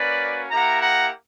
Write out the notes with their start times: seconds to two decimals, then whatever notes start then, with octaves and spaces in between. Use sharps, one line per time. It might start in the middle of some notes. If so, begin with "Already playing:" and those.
Already playing: A#3 C#4 F#4 B4 D5
0.51 A#3 E4 G4 F#5 A#5
0.81 F#5 A#5